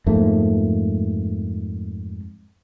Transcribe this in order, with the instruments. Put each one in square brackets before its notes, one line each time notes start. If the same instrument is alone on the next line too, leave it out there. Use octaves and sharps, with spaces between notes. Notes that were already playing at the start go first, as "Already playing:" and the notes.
[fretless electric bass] F2 G#2 A3 A#3